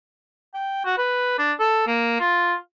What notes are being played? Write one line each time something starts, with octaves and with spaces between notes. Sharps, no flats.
G5
F#4
B4
D4
A4
A#3
F4